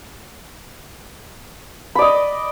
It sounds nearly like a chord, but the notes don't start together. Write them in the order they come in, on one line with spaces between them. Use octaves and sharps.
B5 D5 D#5